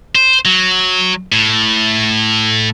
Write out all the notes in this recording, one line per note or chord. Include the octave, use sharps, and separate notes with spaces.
C5
F#3
A2